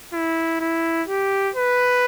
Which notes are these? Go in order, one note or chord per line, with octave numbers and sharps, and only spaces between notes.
E4
E4
G4
B4